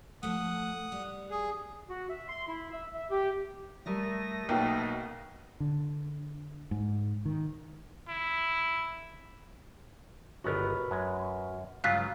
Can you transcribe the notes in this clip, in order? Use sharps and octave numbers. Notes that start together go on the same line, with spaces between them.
F3 A3 F#5 D#6
G3
G#4
F#4
E5
C6
E4
E5
E5
G4
G3 A3 A#4 D5 D#6 A#6
B1 B2 A#3 G5
D3
G#2
D#3
E4
G1 C#2 B3 F#4 A#4 B4
F#2 G#3
C#2 G2 C#3 F#3 F4 F5 F#6 B6